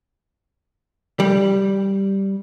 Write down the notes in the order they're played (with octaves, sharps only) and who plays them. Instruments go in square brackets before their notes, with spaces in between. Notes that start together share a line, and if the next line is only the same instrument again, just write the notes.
[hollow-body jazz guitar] G3